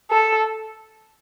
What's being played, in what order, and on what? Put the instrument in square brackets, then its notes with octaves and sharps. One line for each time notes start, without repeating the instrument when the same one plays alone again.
[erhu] A4